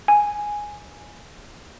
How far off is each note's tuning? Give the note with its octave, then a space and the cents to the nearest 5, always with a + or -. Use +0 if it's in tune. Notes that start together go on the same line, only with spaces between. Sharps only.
G#5 +0